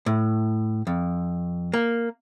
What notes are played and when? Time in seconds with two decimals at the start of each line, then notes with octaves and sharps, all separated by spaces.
0.06 A2
0.87 F2
1.74 A#3